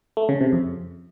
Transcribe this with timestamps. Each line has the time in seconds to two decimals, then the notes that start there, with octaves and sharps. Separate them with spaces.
0.17 A3
0.29 C#3
0.41 C3
0.53 F2